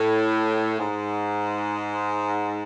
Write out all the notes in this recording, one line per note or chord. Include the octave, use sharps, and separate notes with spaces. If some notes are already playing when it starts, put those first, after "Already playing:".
Already playing: A2
G#2